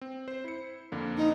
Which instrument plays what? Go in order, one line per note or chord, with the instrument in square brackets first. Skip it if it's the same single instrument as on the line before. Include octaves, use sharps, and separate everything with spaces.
[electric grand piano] C4
C5
E4 C#7
F2 D3 A#3
[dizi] D#4